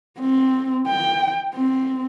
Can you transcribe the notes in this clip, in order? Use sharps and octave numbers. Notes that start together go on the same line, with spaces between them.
C4
G5
C4